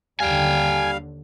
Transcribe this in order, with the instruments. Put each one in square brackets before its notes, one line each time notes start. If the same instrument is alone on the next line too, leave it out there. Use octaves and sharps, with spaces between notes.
[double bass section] D#2 D3 [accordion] G3 F5 [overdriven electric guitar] G5 G#5